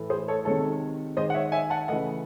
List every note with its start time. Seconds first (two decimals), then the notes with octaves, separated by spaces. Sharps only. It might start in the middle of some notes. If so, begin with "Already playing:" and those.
Already playing: A2 E3 A3
0.10 G#4 C5
0.28 A4 C#5
0.45 C3 D#3 G#3 A4 C#5
1.17 D#3 G#3 C5 D#5
1.30 F#5
1.34 C#5 E5
1.52 E5 G#5
1.70 F#5 A5
1.88 C#3 E3 A3 D#5 F#5